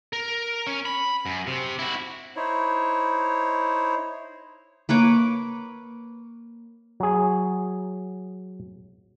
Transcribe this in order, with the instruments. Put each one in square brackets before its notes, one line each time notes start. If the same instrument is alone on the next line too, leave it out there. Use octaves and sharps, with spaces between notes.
[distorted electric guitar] A#4
C#4
B5
F#2
C3
E4 F#4
[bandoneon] D#4 E4 C5 C#5
[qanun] A#3 B4 C#5 D6
[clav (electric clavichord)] F#3 G#4